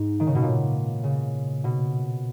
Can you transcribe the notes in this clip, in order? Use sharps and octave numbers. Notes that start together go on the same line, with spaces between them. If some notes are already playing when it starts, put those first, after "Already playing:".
Already playing: G#2
D#3
C#3
B2
A#2
C#3
B2